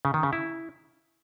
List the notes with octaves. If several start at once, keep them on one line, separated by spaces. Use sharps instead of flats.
C#3
D#3
C#3
E4